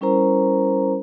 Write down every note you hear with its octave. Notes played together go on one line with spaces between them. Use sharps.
G3 C#4 E4 A#4 C5 A#5